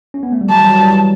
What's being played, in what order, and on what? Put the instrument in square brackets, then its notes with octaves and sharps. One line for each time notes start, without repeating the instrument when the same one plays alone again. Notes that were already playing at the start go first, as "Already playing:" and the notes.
[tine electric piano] C#4
B3
A3
G3
[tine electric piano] F#3 [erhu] A5
[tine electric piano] E3 G3
F#3
E3 G3
E3